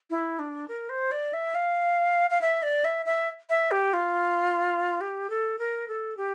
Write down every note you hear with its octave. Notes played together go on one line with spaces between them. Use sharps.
E4
D4
A#4
C5
D5
E5
F5
F5
E5
D5
E5
E5
E5
G4
F4
G4
A4
A#4
A4
G4